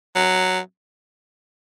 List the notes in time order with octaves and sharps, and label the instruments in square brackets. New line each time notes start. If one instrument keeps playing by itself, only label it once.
[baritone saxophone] F#3